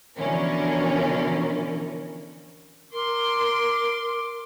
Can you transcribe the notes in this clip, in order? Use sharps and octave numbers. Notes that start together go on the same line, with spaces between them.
B2 D3 E3 F3 C#4 A#4
A#4 C6 D6